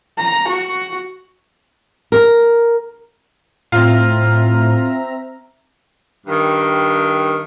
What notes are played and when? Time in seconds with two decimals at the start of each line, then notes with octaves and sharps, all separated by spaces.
0.18 A#5
0.48 F#4
2.12 A#4
3.72 A2 C4 F4 E5 A#5
6.27 G2 D#3